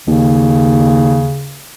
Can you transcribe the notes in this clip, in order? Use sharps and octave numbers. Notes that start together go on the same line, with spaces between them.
D#2 C#3